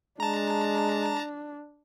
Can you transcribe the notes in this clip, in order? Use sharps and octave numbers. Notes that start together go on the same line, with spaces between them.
G#3 D4 A5 A#5